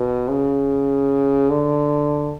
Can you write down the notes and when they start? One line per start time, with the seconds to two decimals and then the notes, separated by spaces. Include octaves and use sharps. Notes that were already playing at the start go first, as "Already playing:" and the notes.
Already playing: B2
0.29 C#3
1.50 D3